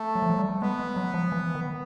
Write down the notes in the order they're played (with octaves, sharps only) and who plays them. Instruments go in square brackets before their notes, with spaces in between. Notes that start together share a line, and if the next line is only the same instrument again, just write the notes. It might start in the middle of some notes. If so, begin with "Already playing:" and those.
Already playing: [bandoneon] A3
[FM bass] F#3
F3
F#3
G3
[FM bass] G#3 [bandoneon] B3
[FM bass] G#3
F#3
F3
E3
D#3